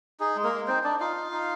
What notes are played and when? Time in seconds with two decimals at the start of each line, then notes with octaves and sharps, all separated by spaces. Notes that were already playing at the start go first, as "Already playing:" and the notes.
0.20 D#4 G#4
0.36 G#3
0.44 A#3 A#4
0.53 G#3
0.67 C4 D#4 C5
0.84 D4 D#4 D5
1.00 D#4 F4 F5
1.16 D#4
1.32 D#4